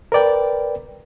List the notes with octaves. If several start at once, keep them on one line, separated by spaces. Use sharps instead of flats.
A#4 B4 D5 G5